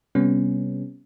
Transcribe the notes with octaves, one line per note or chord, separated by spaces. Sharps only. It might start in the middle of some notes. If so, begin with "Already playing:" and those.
C3 G3 B3 C#4